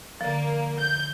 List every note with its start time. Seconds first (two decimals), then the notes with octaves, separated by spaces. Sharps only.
0.21 D3 F3 A#3
0.79 G6